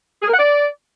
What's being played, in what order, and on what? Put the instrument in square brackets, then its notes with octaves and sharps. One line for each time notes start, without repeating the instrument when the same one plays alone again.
[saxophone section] G#4
A#4
F#5
D5